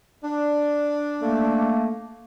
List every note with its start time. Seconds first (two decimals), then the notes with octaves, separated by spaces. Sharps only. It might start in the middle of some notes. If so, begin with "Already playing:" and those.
0.24 D4
1.21 A3 A#3